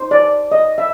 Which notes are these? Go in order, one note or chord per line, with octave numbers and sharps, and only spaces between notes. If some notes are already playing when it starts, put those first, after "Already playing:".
Already playing: D#4 C5
D5
D#5
E5